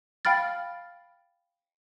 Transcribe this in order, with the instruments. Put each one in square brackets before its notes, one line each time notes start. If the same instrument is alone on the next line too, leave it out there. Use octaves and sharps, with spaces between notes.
[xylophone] F5 G5 B5 F6 A6